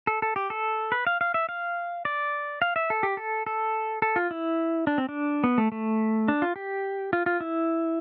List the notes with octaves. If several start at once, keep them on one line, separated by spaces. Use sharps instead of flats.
A4
A4
G4
A4
B4
F5
F5
E5
F5
D5
F5
E5
A4
G4
A4
A4
A4
F4
E4
D4
C4
D4
B3
A3
A3
D4
F4
G4
F4
F4
E4